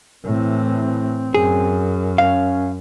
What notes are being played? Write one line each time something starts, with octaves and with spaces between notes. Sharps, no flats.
A2 E3 C4
F#2 G#4
C#4 F5